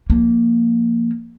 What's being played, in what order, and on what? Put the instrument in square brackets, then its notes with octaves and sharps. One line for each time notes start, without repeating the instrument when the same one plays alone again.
[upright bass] F3 A#3